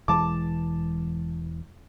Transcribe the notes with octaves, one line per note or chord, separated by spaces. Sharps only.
E1 E3 G#3 A5 D6